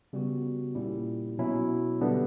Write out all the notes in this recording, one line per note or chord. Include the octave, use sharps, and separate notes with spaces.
C#3 G3 B3 F#4
A#2 G3 A#3 C#4 E4
B2 F#3 C#4 E4
D3 G3 B3 D4